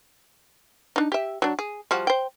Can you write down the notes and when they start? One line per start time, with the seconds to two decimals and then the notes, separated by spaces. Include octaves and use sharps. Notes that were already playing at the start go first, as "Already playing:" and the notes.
0.96 D4 D#4
1.12 G4 E5
1.42 F#3 D4
1.59 G#4
1.91 F3 G3 F#4
2.07 C5 G5